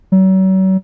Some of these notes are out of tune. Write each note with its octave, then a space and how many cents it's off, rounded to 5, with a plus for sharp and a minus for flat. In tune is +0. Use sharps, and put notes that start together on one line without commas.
F#3 +40